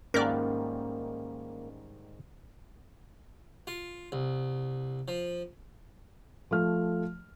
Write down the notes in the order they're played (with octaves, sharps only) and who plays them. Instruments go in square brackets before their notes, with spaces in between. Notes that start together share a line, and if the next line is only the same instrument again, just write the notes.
[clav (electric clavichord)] G#2 D#3 G3 [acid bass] A#3 [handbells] C#4 [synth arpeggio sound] A#4 D5
[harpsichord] F4
C2
F3
[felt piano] F3 A3 F6